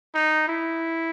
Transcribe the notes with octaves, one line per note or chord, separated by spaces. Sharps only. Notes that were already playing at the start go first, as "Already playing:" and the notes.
D#4
E4